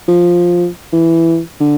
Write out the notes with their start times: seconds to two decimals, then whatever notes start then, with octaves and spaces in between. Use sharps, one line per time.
0.08 F3
0.93 E3
1.61 D3